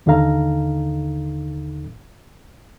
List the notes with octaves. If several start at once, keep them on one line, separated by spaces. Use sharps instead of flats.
D#2 D3 D#4 A4 F5 A#5